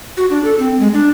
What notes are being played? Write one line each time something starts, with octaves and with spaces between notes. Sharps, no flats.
F#4
D4
A4
C4
G#3
D4